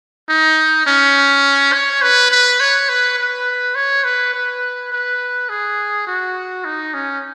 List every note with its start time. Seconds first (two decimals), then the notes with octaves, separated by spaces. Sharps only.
0.29 D#4
0.86 C#4
1.73 C#5
2.02 B4
2.31 B4
2.60 C#5
2.89 B4
3.18 B4
3.75 C#5
4.04 B4
4.34 B4
4.92 B4
5.49 G#4
6.07 F#4
6.65 D#4
6.94 C#4